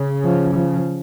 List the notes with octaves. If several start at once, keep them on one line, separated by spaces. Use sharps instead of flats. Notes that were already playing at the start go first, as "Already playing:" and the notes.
Already playing: C#3
F3
F3